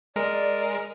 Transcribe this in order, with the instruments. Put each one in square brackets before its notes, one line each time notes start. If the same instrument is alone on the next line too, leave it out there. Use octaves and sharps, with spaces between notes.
[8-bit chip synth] G#3 A#4 [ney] D5